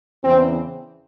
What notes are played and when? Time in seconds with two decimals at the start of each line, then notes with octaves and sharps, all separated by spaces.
0.23 E2 C#3 E3 C4